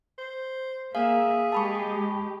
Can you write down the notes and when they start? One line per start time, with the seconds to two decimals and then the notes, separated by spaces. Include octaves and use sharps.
0.18 C5
0.95 A#3 G#4 E5 F5
1.52 G#3 G4 A5 B5 C#6